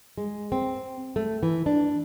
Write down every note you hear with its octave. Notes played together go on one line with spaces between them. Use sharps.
G#3
C4
A3
E3
D4